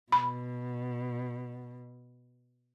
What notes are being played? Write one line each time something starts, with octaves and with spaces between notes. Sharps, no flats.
B2 B5